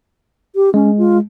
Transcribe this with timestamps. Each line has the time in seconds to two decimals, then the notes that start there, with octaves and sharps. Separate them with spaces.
0.55 G4
0.74 G#3 C#4
0.98 F4